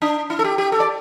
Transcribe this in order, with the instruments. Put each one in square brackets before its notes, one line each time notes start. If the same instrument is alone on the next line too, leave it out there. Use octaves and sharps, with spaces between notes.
[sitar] D4
E4
A4
G4
G4
A4
D5